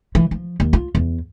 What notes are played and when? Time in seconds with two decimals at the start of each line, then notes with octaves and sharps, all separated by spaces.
0.15 E3
0.31 F3
0.60 D#2
0.73 F4
0.95 E2